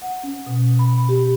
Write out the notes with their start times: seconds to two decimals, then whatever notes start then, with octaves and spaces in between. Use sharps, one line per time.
0.02 F#5
0.23 C#4
0.46 B2
0.79 B5
1.09 G4